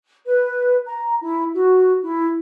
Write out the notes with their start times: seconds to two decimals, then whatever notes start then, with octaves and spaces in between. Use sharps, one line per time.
0.27 B4
0.86 A#5
1.22 E4
1.53 F#4
2.02 E4